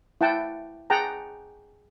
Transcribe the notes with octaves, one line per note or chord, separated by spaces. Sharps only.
E4 F#5 G5 A5
G#4 F#5 G5 A5 A#5